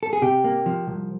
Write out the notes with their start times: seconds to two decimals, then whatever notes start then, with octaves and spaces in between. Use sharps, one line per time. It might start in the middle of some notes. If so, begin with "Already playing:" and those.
0.03 A4
0.13 G#4
0.22 C3 G4
0.44 A#3
0.66 F3
0.87 C2